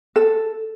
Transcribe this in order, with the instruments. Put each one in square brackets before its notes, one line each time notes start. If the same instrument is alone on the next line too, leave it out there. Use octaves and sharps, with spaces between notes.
[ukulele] A4